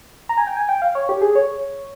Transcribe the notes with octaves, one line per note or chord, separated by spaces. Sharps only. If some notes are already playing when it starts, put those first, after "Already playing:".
A#5
G#5
G5
G#5
G5
F5
C#5
G4
G#4
C#5